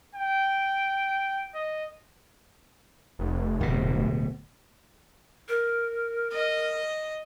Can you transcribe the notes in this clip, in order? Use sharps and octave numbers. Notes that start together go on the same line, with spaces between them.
G5
D#5
F1
D1 B2
A#4
D#5